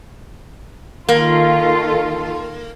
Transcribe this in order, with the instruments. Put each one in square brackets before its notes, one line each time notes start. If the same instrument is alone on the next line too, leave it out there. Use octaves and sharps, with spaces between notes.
[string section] D#3 F4 A4 [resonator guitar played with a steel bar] A#3